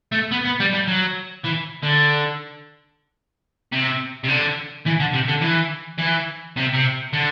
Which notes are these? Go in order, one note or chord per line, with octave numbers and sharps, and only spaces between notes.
A3
B3
B3
G3
G3
F#3
E3
D3
C3
C3
D3
E3
D3
C3
D3
E3
E3
C3
C3
D3